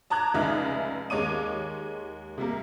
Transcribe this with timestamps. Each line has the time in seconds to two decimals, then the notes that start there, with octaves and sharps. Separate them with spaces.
0.10 A5 A#5 D6 F#6 G#6
0.34 F1 C#2 D#4 E5 F6
1.10 D#2 G#3 C#5 D6 D#7
2.38 C3 G3 A#3